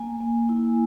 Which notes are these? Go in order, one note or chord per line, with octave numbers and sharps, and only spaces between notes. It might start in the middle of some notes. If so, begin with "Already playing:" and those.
Already playing: A#3 G#5
A#3
E4